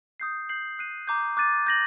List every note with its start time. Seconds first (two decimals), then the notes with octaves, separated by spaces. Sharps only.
0.20 D#6 G6 C7
0.49 G6 C7 F#7
0.79 F#6 C7 D#7
1.08 A#5 D6 G6
1.37 D6 F#6 A6 D#7
1.67 G6 A#6 F#7